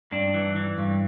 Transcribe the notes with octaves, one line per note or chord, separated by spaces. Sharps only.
G2 D4
E3
E3
G2